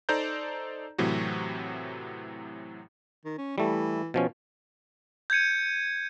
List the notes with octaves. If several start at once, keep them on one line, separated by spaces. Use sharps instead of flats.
D#4 A4 C5 D5 A#5 G6
A2 C3 E3 F#3 F#4
D#3
C#4
E3 G3 A3
B2 F3 C#4
G6 G#6 C#7 D#7